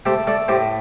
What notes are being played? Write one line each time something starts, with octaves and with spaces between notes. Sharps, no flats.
A3 G4 C5
A3 A4 D5
A2 G4 C5